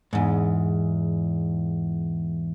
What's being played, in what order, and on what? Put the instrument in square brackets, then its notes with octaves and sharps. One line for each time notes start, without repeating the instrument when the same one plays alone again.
[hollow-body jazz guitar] E2 G#2